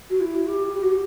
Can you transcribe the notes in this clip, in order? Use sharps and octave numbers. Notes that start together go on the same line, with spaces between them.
F#4
E4
G4
G4
F#4
G4